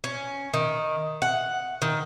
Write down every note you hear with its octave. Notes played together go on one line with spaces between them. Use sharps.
C#4
D#3
F#5
D#3